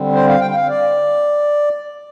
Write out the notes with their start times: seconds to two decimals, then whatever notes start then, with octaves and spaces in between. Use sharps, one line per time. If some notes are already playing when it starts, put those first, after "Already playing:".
Already playing: D3 G3 C4
0.13 C5
0.27 F5
0.40 G5
0.50 G5
0.55 F5
0.69 D5